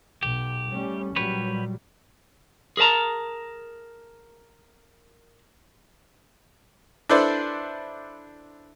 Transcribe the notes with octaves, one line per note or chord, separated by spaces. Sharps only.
B1 G4
G3 A3 C#4
A#2 F#3 G3 G4 B4 C#5
G#4 A#4 B4 A5 A#5
D4 E4 A4 B4 C5 D5